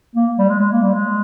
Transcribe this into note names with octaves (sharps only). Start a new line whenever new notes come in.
A#3
G3
G#3
G#3
A#3
G3
G#3